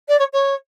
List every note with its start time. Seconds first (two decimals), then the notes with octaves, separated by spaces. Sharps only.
0.08 D5
0.19 C#5
0.33 C#5